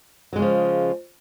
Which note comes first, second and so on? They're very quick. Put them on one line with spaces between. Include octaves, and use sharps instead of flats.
F#3 G#3 C#3 F3